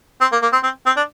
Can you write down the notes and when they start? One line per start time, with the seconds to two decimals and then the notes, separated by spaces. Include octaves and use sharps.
0.21 C4
0.32 A#3
0.42 A#3
0.53 C4
0.64 C4
0.86 C4
0.97 D4